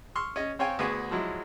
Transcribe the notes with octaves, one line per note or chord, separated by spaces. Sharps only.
C6 C#6 E6 F6
C#4 D#5
C4 C#5 F5 G5 G#5
D2 B3 G#4 G#5 C#6
F3 F#3 G#3 E4